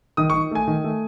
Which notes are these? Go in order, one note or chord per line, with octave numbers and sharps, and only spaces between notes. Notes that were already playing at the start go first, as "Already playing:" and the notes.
D#3 D#6
D#3 C#6
A3 G#5
D#3
A3